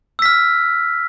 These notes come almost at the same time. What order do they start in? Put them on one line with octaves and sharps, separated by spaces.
E6 B6 F6